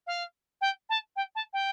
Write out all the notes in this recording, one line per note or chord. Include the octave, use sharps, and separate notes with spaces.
F5
G5
A5
G5
A5
G5